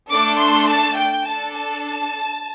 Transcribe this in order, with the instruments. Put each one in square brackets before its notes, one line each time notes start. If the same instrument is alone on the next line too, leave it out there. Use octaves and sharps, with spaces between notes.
[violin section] A3 D4 A4 D6
C6
A5
G5
D4 A4 A5
A5